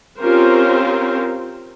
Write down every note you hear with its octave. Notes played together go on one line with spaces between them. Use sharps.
C4 C#4 F4 G4 A#4 C5